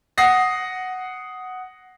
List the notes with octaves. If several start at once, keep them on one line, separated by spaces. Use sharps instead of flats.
F#5 D#6 A#6 C7